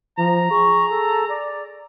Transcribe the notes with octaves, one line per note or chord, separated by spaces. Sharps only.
F3 A#5
G#4 C#6
A4
D5